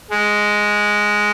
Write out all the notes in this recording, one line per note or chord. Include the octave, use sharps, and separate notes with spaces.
G#3